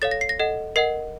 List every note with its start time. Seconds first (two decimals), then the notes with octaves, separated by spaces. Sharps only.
0.02 A4 C#5 F5 A6
0.11 A#6
0.21 C7
0.29 A#6
0.40 A4 D#5 F#5
0.76 A#4 D#5 F#5 C7